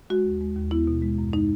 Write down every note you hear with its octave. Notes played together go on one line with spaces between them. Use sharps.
G#3 F#4
D#2
G#3
D#2
B3 E4
B2
G#3
F#2
G#3 D#4